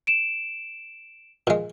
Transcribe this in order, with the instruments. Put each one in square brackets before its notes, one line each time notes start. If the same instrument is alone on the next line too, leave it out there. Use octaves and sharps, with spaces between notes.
[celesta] D7 E7
[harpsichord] A#2 G#3